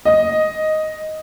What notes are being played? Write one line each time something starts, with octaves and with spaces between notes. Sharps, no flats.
D#5